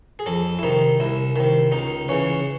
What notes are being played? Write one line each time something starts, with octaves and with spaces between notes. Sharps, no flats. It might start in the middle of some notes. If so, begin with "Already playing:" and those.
G#4
F2 A4
E4
C3 D#3 D#4
C2 E4
C3 D#3
C#2 D#4
C#3 E3 C#4